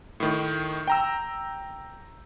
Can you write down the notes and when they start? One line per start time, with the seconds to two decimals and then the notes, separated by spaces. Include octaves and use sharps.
0.20 A2 D#3
0.88 G5 A#5 E6